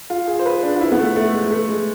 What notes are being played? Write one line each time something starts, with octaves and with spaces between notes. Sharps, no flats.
F4
G#4
C5
B4
D4
F4
E4
B3
A3
A3
G#3
A3
G#3